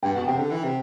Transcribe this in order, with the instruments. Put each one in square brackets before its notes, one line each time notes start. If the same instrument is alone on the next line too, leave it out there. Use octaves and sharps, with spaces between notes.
[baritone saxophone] G2 [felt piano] G5
[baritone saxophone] B2 [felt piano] F#5
[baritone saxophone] C3 [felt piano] G5
[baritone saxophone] D3
E3
C3